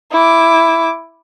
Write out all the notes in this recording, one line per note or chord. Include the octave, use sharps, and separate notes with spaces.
E4 D6